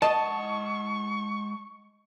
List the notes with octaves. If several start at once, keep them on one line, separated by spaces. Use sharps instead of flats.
G#3 D#5 F#5 A5 C#6